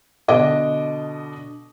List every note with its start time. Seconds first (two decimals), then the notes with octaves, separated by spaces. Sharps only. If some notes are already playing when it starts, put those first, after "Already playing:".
0.28 B2 D3 D4 D#5 D6